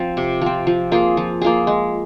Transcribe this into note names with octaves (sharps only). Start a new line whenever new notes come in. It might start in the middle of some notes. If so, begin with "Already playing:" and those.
Already playing: F3 C4
C3
F3 C4
F3
A#3 F4 G#4
F3
A#3 F4 G#4
G#3